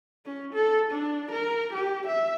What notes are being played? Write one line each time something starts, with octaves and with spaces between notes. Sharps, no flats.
C#4
A4
D4
A#4
G4
E5